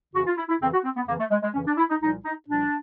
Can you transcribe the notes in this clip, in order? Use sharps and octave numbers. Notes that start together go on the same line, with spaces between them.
F2 C#3 E3 F#4
F4
E4
E4
F2 C#3 E3 C4
F#4
C4
B3
F2 C#3 E3 A#3
A3
G#3
G#3
F2 C#3 E3 C#4
D4
E4
D#4
C2 A#2 F3 D#4
D#4
C2 A#2 F3 D4